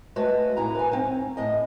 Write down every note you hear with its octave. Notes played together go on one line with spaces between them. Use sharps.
G#3 A3 F#4 B4
A2 E4 G#5 A#5
B4 G#5
C4 C#4
A2 D#5 G#5